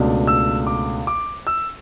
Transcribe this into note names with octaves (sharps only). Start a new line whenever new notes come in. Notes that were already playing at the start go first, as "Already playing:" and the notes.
Already playing: C#2 B2 A3 D4
E6
D6
D6
E6